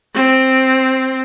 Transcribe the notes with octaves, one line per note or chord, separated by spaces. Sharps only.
C4